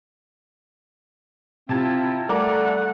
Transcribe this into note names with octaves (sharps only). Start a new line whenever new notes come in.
C3 C4 E4 F4 A5 G#6
G3 A3 A#4 D5 F#5 D6